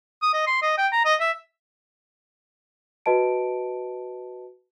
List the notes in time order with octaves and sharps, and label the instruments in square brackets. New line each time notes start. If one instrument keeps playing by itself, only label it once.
[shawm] D#6
D#5
C6
D#5
G5
A#5
D#5
E5
[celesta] F#4 B4 D#5 A5 D7